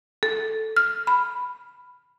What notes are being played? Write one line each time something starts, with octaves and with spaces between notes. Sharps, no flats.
A4
F6
B5